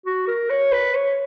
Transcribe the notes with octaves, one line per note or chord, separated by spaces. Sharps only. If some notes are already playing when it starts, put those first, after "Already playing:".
F#4
A#4
C#5
B4
C#5